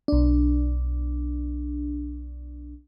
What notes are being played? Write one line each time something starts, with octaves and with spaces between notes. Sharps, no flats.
B1 D4